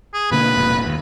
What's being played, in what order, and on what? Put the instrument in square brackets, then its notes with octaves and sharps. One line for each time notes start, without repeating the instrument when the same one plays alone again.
[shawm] G#4
[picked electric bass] B2 D3 A#3 [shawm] B4
[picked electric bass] F1 A#2
D#2